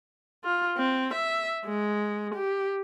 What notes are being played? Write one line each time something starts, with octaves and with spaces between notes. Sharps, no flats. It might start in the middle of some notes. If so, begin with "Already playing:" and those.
F4
C4
E5
G#3
G4